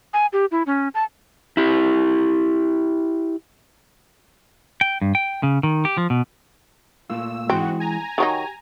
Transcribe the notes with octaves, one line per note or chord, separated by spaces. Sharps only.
G#5
G4
E4
C#4
A5
E4 G4
G5
G2
G5
C#3
D#3
G4
F3
B2
A#2 A3 F4 E6
G#2 E3 G#3 C4 F#4
G#5 A#5
D#3 F#3 D#4 G4